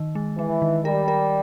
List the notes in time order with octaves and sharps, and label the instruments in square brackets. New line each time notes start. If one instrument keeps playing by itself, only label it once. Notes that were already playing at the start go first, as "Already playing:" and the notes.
Already playing: [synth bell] D#3
G#3
[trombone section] E3 [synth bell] G#3
[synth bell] D#3
[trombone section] G3 [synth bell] A#4
[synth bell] A#4